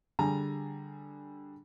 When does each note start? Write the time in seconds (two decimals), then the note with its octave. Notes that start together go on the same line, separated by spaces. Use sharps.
0.19 D3 G3 G#4 G#5 A#5